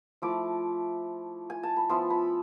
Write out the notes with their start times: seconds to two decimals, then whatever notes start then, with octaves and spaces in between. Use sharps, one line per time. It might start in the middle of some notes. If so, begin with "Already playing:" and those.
0.22 F3 A3 E4 D6
1.50 G#5
1.63 A5
1.77 B5
1.89 F3 B3 E4 C6
2.10 B5